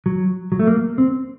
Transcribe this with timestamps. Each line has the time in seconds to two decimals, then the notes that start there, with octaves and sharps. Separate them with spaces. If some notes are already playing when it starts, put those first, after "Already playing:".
0.06 F#3
0.52 F#3
0.59 A3
0.67 A#3
0.98 C4